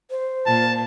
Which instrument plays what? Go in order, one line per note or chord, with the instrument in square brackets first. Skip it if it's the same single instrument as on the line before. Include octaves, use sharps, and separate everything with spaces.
[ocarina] C5
[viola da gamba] A#2 [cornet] A5